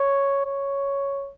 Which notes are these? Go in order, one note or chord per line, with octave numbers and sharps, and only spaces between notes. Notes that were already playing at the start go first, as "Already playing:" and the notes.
Already playing: C#5
C#5